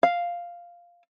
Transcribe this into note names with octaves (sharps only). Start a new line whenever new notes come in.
F5